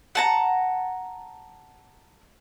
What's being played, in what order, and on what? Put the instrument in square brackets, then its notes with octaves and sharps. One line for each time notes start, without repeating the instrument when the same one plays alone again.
[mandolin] F#5 A5 A#5